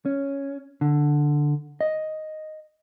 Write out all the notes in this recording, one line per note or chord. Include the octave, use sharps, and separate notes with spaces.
C#4
D3
D#5